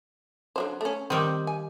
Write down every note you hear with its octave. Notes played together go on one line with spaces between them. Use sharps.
D3 F#3 C5
A3 C#4
D#3 G3 C4
G#5